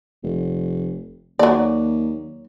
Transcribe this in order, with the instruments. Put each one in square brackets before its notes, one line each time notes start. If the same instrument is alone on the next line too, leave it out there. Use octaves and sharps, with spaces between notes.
[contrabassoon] F1
[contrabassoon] D#2 [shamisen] F#3 D5